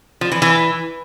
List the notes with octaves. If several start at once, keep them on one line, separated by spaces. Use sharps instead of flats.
F3
E3
E3